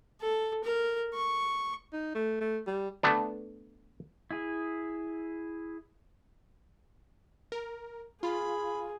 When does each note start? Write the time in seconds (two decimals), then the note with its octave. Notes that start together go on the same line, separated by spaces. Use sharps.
0.21 A4
0.64 A#4
1.14 C#6
1.93 D#4
2.15 A3
2.41 A3
2.67 G3
3.03 A3 B3 D4
4.31 E4 G#4
7.52 A#4
8.23 F4 G#4 B5